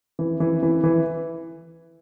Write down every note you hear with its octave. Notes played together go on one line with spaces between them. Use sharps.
E3
E3
E3
E3